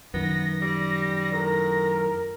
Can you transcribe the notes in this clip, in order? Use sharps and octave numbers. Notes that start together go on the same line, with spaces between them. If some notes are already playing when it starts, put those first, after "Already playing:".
F#2 D#3 B3 A#6
G3
A2 A#4